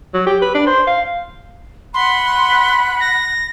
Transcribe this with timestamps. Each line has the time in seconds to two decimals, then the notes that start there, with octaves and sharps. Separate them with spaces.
0.14 F#3
0.27 G4
0.42 B4
0.55 D4
0.67 C5
0.87 F5
1.94 F#5 B5 C6 F#6
3.00 A#6